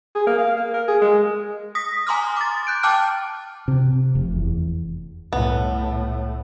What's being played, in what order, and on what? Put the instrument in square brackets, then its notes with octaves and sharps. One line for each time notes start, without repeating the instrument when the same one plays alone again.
[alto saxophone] G#4
A#3
F5
A#3
A#4
G#4
G#3
[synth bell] D#6 A#6 B6
G#5 A#5 C6 D6 D#6 F6
D6 A6
F#6 G6 D7
G5 A5 D6 F6 F#6
[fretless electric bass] C3
F1
E2
[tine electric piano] C2 [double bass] A2 [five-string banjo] B3